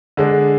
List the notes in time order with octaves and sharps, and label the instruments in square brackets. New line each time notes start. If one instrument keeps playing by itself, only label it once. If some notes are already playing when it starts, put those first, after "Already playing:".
[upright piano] D3 G#3 D4